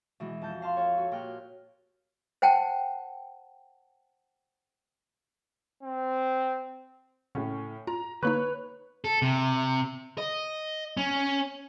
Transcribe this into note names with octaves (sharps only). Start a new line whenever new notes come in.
B2 E3 G#3
F2 A5 G6
F5 A5 C6
F4 A4 C#5
F#4
A#2 G4 G5 F6 F#6
C5 F#5 G5 A5
C4
A2 C#3 C#4
F4 A#5
D3 A#3 D#4 B4 C#5 F#6
A4
C3
D#5
C#4